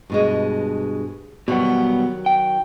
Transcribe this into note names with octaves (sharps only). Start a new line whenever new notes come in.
G2 B2 G#3
B2 D#3 F#3 G3 B3
G5